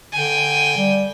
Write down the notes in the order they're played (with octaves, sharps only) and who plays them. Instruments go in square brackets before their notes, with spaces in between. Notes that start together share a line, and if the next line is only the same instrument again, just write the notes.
[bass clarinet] D3 [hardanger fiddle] G5 G#5
[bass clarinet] G3